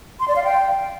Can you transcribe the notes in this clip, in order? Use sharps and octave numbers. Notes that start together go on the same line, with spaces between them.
C6
D5
F5
G5